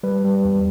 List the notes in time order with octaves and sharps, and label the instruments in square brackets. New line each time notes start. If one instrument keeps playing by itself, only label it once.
[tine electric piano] G3 B4
G3
E2